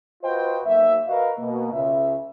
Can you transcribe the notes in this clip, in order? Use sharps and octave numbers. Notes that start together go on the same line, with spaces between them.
F4 F#4 B4 C5 D#5 G5
B1 F#3 A#3 E5
F#4 A#4 B4 D#5 F5
B2 A#3
C#2 C#3 E5